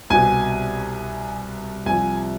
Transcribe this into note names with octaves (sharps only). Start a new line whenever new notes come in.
C2 B2 G#5
C2 C3 F3 G#5